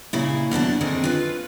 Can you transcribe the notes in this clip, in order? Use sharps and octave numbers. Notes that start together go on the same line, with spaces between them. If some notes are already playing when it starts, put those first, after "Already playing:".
A#2 C#3 E4
F#2 B2 D4 A5
D3 D#3 C4 G#4
F4 B4